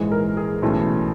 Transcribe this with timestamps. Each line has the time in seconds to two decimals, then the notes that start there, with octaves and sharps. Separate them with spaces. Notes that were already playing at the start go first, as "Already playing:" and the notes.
Already playing: A#1 G#2 E3 G#3
0.12 A#4
0.37 G#4
0.62 B1 A2 E3 A3 C#4